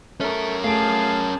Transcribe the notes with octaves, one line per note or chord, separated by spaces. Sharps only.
A3 C#4 A#4
A3 G#4 F5 A5 D7